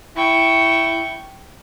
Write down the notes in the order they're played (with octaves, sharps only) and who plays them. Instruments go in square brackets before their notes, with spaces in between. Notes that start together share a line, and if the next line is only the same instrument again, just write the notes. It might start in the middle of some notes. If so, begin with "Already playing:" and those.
[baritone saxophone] E4 [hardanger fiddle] G5 C#6